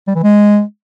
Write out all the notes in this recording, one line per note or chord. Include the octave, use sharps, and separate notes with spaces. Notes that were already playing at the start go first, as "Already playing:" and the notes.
G3
E3
G#3